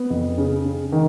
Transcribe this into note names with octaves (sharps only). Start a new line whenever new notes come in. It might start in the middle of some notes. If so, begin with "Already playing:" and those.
Already playing: B3
F2
C#3
C#3
D#3